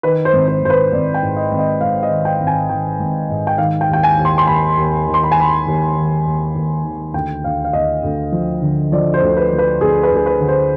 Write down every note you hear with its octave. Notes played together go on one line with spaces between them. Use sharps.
D#3 B4
C5
G#1
C5
G#1 C5
B4
G#1 D5
G5
G#2
D#5
G#1
D#5
G#2 F5
D#5
D#3
G5
G#1
G#5
D#3 G5
G#1
G#2
G5
D#3 F5
G5
D#2
G5
G#5
D#2
C6
C6
D#2 B5
D#2
D#3
C6
B5
G#5
D#3 B5
D#2
D#3
D#2
D#2
D#3
D2 G5
D2 F5
F5
D2 D#5
D2
F3
D3
F3 D5
C5
D2
B4
F3
B4
D2 G#4
B4
D2
G#4
B4
D3
C5